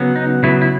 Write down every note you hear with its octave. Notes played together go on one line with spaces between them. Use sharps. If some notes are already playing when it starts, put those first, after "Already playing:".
Already playing: C#3 F#3 B3
D#4
C#3 F#3 B3 E4
E4